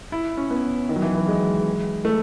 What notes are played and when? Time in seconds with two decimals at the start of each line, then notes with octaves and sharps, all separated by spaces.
0.12 E4
0.37 C#4
0.50 B3
0.89 D#3
0.96 F#3
1.02 E3
1.15 E3
1.28 G#3
2.05 A3